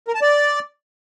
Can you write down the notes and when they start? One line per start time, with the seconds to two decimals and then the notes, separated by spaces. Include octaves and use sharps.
0.08 A#4
0.15 A5
0.22 D5